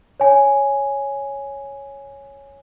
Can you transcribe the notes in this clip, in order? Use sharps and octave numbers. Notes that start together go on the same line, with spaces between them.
C#5 G#5